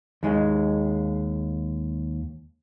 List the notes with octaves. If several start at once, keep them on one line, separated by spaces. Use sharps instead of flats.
D#2 G#3